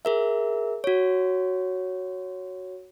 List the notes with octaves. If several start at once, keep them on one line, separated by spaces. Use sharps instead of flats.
G#4 A#4 E5
F#4 C#5